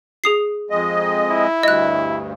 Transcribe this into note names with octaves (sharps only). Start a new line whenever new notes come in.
G#4 D#6 C7
F2 G#3 D#5
E4
D2 G2 D#5 F#6